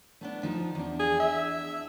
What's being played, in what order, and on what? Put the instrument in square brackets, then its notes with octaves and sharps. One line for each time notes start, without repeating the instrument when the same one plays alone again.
[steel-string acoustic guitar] A3 B3 D4
F3 D#4
E2 D4
[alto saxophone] G#4
E5